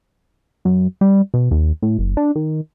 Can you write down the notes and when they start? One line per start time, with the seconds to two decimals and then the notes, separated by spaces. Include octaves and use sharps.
0.65 F#2
1.01 G3
1.34 B2
1.51 D#2
1.82 A2
1.99 F#1
2.17 D4
2.36 D#3